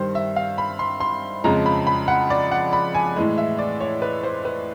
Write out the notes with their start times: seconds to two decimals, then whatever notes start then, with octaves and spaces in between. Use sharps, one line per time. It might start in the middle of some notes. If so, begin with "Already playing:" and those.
Already playing: G2 D#3 G3 C5
0.15 E5
0.36 F5
0.58 B5
0.79 C6
1.00 C6
1.44 F2 C#3 F3 G#3 A#5
1.66 B5
1.87 B5
2.08 F#5
2.30 D5
2.52 F#5
2.73 B5
2.95 G#5
3.16 A2 E3 G#3
3.38 E5
3.59 D5
3.80 C#5
4.02 B4
4.23 C5
4.45 B4